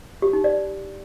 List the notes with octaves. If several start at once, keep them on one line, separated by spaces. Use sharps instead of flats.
G4
D#4
D5